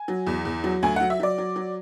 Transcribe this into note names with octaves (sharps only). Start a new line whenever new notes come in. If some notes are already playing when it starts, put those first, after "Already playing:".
Already playing: G#5
F#3
E2
E2
F#3
D2 G#5
F#3 F#5
E5
F#3 D5
F#3
F#3